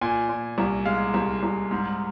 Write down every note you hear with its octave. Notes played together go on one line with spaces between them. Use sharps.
A#2 G#5
A#2
C2
G#3 F5
C2
C2
G#2